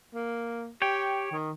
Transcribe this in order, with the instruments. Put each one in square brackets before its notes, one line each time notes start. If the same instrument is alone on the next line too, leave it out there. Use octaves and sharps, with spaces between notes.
[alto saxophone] A#3
[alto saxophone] G4 [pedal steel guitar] C#5 G5
[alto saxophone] D#3